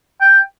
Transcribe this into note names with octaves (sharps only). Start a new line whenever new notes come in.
G5